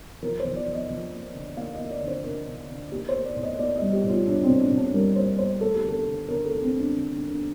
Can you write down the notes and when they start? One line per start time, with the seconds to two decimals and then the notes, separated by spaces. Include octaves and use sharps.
0.22 F3 A#4
0.40 C5
0.45 F3
0.56 D5
0.68 F3
0.73 D#5
0.90 F3
1.13 A#3
1.34 D3
1.57 A#3 F5
1.74 D#5
1.80 A#3
1.91 D5
2.02 D3
2.08 C5
2.24 D3 A#4
2.47 D3
2.70 D3
2.92 A#3 G4
3.09 C5
3.14 A#3
3.25 D5
3.36 A2
3.43 D#5
3.59 A#3 D5
3.76 D#5
3.82 G3
3.93 G4
4.04 A2
4.09 F4
4.26 A2 D4
4.43 C4
4.49 A2
4.60 D4
4.71 A2
4.77 D4
4.94 G3 A#4
5.16 A#3 C5
5.38 A#3 C5
5.61 A3 A4
5.75 G4
5.83 D3
5.89 A4
6.06 D3
6.28 D3 A#4
6.45 A4
6.50 A3
6.62 C4
6.73 A3
6.79 D4
6.95 D3
7.12 D4
7.18 D3
7.29 D4